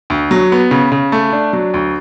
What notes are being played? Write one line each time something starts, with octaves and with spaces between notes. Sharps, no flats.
D2
F#3
B3
C#3
C#3
A3
D4
F#3
D2